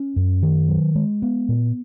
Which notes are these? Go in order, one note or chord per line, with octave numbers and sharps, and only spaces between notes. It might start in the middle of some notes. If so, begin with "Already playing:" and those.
Already playing: C#4
F#2
D#3
F#3
G#3
B3
A#2